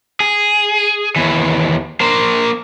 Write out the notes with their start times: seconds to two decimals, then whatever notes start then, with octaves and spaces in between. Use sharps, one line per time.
0.20 G#4
1.16 D#2 E3
2.01 A#3 C5